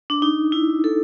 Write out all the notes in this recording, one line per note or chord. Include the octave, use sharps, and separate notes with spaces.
D4
D#4
E4
A4